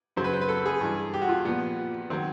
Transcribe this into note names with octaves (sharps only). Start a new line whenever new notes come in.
F#2 C#3 F#3 C5
B4
C5
B4
A4
G#4
G2 E3
G4
F#4
F4
A#2 F3 B3
D#3 F#3 C4